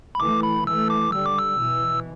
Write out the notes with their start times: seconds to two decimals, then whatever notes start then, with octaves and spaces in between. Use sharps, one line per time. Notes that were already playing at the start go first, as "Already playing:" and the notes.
0.15 B5
0.20 E3 A3 D6
0.43 B5
0.67 E3 A3 E6
0.90 D6
1.12 D3 G3 E6
1.26 D6
1.38 E6
1.59 B2 E3